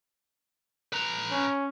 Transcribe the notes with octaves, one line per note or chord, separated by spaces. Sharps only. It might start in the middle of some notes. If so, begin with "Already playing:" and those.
B4 A#5
C#4